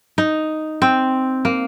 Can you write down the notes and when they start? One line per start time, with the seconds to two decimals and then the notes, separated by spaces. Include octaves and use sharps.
0.18 D#4
0.82 C4
1.45 A#3